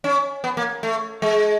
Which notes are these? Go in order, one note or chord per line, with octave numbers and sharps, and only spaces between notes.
C#4
B3
A#3
A3
G#3